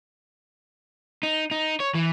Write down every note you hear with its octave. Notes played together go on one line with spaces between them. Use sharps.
D#4
D#4
C#5
E3